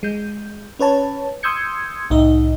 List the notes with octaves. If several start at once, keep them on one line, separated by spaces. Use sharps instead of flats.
G#3 G6
C#4 B4 C#5 A5
C6 D#6 E6 G6 G#6 C#7
C2 A2 D#4 D#5